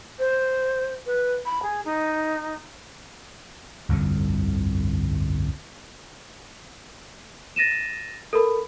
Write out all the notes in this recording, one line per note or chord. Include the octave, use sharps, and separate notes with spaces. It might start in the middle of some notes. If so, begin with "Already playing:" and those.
C5
B4
B5
G#4
D#4
G1 C2 F2 D3
A6 A#6 D#7 E7
A4 A#4 B5